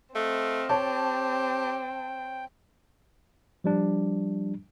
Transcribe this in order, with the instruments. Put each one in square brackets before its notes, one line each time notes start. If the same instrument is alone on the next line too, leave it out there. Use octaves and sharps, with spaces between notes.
[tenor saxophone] A3 [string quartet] C4 [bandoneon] D#5 F5
[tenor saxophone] G4 [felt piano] C#5 A5 [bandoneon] G5
[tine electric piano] F3 G3 D4